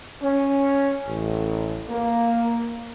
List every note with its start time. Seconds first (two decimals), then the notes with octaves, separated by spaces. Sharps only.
0.22 C#4
1.06 A1
1.89 A#3